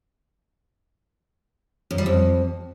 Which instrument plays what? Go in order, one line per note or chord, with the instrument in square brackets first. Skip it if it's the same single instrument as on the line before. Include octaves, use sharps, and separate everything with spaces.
[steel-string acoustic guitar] F#2
G3
F2